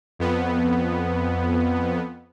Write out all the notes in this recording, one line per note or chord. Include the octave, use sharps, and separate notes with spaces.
F2 B3